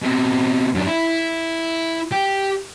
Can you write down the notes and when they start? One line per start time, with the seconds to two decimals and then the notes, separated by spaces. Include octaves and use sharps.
0.02 B2 C4
0.75 F#2 D4
0.87 E4
2.11 G4